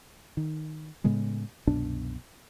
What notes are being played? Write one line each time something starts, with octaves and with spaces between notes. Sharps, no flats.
D#3
A2 C#3 G#3 B3
C2 F#2 B2 D4